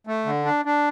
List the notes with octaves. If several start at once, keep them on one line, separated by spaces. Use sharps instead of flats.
A3
D3
D4
D4